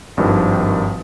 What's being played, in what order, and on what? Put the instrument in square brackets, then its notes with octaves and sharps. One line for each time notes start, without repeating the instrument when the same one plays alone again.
[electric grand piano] G#1 G2 D#3 F3